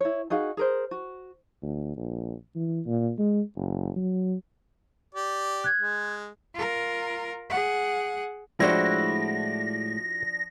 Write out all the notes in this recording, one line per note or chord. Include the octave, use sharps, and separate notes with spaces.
E4 C#5
D#4 F#4 G#4 F5
G#4 A#4 C5
F#4
D2
A#1
E3
A#2
G#3
F#1
F#3
G4 D5
F#6 G#6
G#3
F4 A#4
G#4 F#5
A2 F3 G#3 D4 E4 F#4 C5 A#6